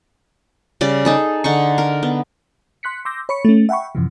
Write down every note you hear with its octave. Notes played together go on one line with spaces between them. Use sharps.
C#3 G3 D5
D#4 G#4 A4
D3 D#4 C#6
A#4
B3
C6 F#6 B6 C#7
C6 D6 E6 G6 A#6
C#5 B5 C#6 C#7
A3 C#4
E5 F#5 G5 B5 C#6
F#2 C3 E3 F3